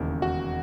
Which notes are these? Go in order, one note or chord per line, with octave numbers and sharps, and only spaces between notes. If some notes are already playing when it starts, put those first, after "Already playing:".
Already playing: E1 D#2 C#3 E3
F#4